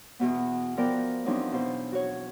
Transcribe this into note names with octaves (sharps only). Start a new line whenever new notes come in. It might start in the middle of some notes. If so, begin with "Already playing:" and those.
E2 B2 B3
F3 B3 A#4 D5 G5
E2 F3 F#3 C4 D4 D#4
B2 C5
F#4 C#5